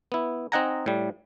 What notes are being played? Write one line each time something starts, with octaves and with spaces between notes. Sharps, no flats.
B3 E4
C4 D#4 D#5 F#5 G#5 A#5
A2 G3